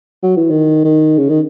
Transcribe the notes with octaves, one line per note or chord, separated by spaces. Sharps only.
F#3
E3
D#3
D#3
C#3
D#3